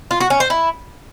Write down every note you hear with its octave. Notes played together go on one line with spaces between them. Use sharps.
F4
F#4
C#4
C5
E4